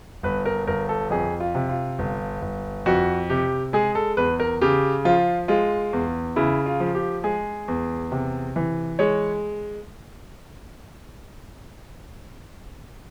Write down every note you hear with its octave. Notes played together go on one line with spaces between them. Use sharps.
G1 B4
A#4
G1 A#4
A4
F2 G#4
F4
C3
F4
G1
G1
F2 F#4
C3 G4
G#3 G#4
A4
E2 B4
A#4
C#3 G4
F3 F4
G#3 F4
E2
C#3 E4
F4
F3
G4
G#3 G#4
E2
C3
E3
G#3 C#5